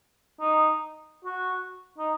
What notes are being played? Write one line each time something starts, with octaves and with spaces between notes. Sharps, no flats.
D#4
F#4
D#4